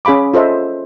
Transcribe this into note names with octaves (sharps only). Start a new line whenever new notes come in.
C#4 G#4 F5 B5 D6
F4 A4 C5 D#5 E5